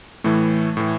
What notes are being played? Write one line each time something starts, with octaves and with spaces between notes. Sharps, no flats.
A2 E3 A3
A2 E3